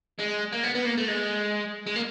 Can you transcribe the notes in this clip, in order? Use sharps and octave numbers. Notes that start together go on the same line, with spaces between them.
G#3
A#3
B3
B3
A#3
A3
G#3
G#3
A#3